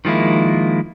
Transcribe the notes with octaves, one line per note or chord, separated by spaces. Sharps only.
D#3 F3 G#3 A#3 E4